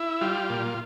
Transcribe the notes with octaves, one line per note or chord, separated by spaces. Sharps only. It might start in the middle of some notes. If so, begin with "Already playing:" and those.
Already playing: E4
G3 F4
A#2